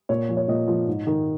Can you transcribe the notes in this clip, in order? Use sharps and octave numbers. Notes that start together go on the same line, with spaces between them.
A#2 C#5
F3
C#5
A#2 D#5
F3
G#2
D#3